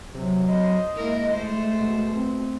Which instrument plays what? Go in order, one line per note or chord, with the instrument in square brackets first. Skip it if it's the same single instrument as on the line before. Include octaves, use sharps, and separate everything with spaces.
[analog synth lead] C3 [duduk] F#3
[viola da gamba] C5 [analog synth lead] D#5
[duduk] G#3 [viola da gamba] A#3 E4 A#4
[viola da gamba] A3 C5
[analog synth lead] B2
[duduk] C4